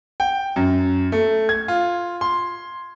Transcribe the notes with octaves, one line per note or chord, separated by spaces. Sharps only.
G5
F#2
A3
G#6
F4
C6